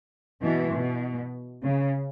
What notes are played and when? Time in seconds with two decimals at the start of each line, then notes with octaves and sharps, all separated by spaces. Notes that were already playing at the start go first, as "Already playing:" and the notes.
0.42 B2 E3
0.73 B2
1.63 C#3